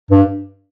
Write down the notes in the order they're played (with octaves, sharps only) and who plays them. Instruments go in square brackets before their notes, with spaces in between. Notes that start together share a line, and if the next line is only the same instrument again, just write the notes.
[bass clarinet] G2